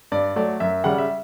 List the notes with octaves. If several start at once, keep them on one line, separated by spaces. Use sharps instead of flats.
G2 D5
F#3 A3 D5
F#2 E5
C#3 G3 F#5
E5